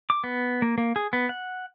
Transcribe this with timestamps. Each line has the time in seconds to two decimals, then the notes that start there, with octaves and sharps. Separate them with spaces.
0.10 D6
0.24 B3
0.62 A#3
0.78 A#3
0.96 G#4
1.13 B3
1.29 F#5